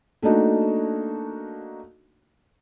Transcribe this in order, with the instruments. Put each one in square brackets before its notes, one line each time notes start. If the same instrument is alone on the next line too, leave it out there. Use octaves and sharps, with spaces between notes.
[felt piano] A3 A#3 D4 D#4 F#4